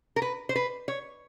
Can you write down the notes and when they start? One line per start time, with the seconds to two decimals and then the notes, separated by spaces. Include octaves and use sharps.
0.16 A#4
0.22 B4
0.49 C5
0.56 B4
0.88 C#5